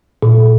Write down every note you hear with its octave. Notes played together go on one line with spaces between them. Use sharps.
A#2